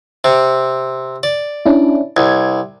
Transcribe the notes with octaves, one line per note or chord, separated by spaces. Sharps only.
C3
D5
C#4 D4 E4
C2 G#6